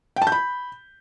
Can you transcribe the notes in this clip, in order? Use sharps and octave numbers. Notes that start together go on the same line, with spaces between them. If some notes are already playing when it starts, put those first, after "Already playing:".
G5
A5
G6
B5